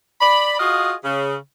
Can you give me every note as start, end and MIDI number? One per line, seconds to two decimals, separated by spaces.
0.21 0.56 74
0.21 0.56 83
0.60 0.94 65
0.60 0.94 66
0.60 0.94 68
0.60 0.94 75
0.60 0.94 77
1.05 1.35 49